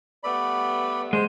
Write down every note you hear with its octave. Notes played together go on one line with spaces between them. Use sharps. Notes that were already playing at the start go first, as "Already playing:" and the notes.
G3 A3 B3 D5 B5
G#3 C5